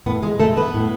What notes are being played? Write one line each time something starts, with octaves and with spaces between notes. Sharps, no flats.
A2 B3
G#3 G#4
G#3 A3 A4
B3 B4
A2